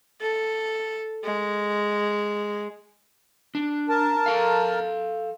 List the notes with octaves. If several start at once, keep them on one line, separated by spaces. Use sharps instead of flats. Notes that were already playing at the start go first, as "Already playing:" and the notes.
A4
G#3
D4
A#4 A5
A4 F5